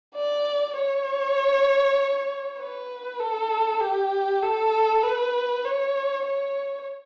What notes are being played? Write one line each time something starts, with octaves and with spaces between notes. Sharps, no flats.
D5
C#5
B4
A4
G4
A4
B4
C#5
C#5